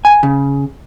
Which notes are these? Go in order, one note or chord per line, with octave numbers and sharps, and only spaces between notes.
G#5
C#3